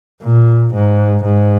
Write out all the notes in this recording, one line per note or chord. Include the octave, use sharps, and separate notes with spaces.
A#2
G#2
G#2